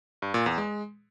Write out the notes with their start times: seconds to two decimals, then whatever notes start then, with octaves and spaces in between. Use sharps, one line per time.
0.22 G2
0.34 A#2
0.46 E2
0.58 G#3